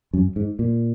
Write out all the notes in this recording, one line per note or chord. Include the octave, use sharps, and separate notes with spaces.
F#2
G#2
A#2